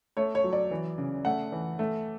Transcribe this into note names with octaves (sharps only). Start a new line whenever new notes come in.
A3 C#5
C#5
F#3
D5
E3
C#3
A3 F#5
E3
A3